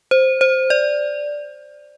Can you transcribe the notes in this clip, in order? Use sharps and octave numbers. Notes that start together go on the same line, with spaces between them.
C5
C5
D5